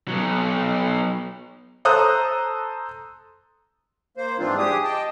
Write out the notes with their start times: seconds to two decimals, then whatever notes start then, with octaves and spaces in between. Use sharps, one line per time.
0.08 F#3 B3
1.85 A4 C5 A#5 D#6 F#6
4.17 A#3 C5
4.39 G#2 E3 G3 C4 D4 F4
4.58 G4 G#4 D#6
4.84 D#5 G5 A5